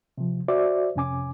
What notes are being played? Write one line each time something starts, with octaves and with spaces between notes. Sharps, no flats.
C3 F3
F#4 C5 D5 E5 D6
F2 C3 C#4 G#5 D6